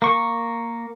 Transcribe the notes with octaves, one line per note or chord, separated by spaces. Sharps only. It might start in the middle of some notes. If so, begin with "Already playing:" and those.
A#3 C#6